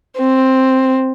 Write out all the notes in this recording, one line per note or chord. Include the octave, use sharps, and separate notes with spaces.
C4